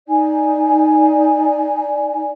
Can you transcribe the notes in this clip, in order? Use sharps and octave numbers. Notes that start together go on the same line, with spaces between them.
D#4 D5 G#5